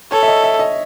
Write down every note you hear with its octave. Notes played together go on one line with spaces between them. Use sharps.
A4 C#5
E5
D#5
E5
D#5